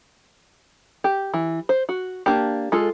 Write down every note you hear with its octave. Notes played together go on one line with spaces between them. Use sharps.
G4
E3
C5
F#4
A#3 D4 G4
G#3 F4 A4